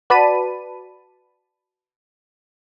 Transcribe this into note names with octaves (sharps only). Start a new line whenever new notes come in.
F#4 B4 D5 A5 B5 D#7